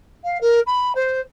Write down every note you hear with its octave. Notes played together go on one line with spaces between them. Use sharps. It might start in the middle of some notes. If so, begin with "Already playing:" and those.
F5
A#4
B5
C5